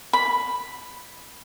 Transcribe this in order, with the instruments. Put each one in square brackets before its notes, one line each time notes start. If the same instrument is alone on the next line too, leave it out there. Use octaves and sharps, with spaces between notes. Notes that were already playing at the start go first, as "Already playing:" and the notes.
[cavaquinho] B5